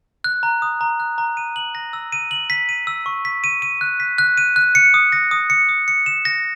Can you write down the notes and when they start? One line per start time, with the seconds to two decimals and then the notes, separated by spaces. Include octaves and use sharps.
0.24 F#6
0.43 A#5
0.62 D#6
0.81 A#5
1.00 F#6
1.18 A#5
1.37 D#7
1.56 F#7
1.75 A#6
1.93 E6
2.12 D#7
2.31 F#7
2.50 B6
2.69 D#7
2.87 E6
3.06 C#6
3.25 B6
3.44 D#7
3.62 D#7
3.81 F#6
4.00 B6
4.18 F#6
4.37 D#7
4.56 F#6
4.75 C#7
4.94 D#6
5.12 A#6
5.31 D#6
5.50 C#7
5.69 D#6
5.88 C#7
6.06 E7
6.25 A#6